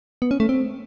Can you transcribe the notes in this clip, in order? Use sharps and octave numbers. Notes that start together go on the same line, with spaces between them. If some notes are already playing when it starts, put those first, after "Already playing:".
B3
C#4
A3
C4